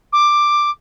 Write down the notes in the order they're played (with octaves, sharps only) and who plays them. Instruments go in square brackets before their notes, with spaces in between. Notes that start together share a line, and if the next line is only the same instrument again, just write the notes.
[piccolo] D6